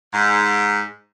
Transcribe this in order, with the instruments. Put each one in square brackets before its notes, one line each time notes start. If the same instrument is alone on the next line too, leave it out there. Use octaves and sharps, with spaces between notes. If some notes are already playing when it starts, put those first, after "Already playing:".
[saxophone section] G#2